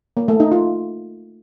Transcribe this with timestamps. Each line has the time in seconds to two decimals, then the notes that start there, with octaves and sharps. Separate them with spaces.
0.17 A#3
0.28 A3
0.40 D#4
0.52 F4